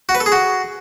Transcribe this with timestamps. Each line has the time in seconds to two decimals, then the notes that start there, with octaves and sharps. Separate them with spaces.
0.09 F#4
0.15 B4
0.20 A4
0.26 G#4
0.32 F#4